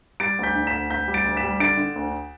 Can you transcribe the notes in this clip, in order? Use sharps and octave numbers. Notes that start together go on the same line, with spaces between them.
G3 A6 D7
D2 G6 B6
D3
B6 E7
D2
D2 G6 B6
G3
A6 D7
D2
B6 E7
G3
D3 A6 D7
D3
D2